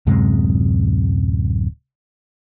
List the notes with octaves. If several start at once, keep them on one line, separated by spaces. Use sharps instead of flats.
D1 F#2 C3 G#3